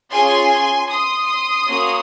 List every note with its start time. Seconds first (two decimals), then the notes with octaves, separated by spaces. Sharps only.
0.11 C#4 F4 G#4 G#5 C6
0.89 C6 D#6
1.67 A#3 C#4 F#4